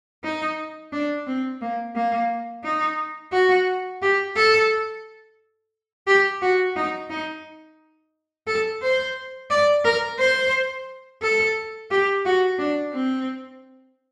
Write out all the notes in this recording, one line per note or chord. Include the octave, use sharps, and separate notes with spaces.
D#4
D4
C4
A#3
A#3
D#4
F#4
G4
A4
G4
F#4
D#4
D#4
A4
C5
D5
A#4
C5
A4
G4
F#4
D4
C4